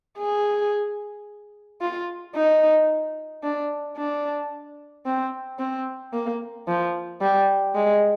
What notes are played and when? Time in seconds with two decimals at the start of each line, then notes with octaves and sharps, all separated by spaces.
0.19 G#4
1.82 F4
2.36 D#4
3.43 D4
3.98 D4
5.06 C4
5.59 C4
6.13 A#3
6.68 F3
7.22 G3
7.75 G#3